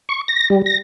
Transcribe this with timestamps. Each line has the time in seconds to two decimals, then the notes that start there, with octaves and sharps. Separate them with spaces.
0.09 C#6
0.28 A#6
0.50 G3
0.66 A#6